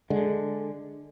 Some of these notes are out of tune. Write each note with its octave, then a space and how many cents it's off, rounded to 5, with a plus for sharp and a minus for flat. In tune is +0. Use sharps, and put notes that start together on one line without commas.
D3 +0 G#3 +10